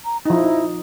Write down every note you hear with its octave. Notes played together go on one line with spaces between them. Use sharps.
A#5
F3 D#4 E4
D#4